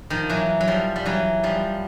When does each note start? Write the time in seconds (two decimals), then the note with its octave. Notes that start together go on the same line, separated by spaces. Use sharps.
0.10 D#3 F3
0.29 E3 F#3
0.60 F#3
0.68 F3 G3
0.96 G3
1.06 E3 F#3
1.43 F3 G3